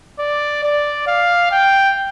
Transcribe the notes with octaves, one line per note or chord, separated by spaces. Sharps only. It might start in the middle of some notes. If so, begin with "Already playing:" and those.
D5
D5
F5
G5